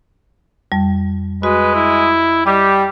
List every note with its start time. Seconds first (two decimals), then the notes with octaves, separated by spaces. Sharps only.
0.72 F2 G3
1.43 G#3 F#4 B4
1.75 E4
2.47 G3 G4 D#5